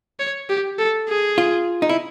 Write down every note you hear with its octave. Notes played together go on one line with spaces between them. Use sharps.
C#5
G4
A4
G#4
F4
D#4
E4